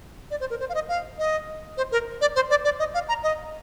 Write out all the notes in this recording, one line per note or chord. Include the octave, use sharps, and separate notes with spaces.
D5
C5
A#4
C5
F5
D#5
F5
D#5
C5
A#4
D5
C5
D5
D5
D#5
F5
A#5
D#5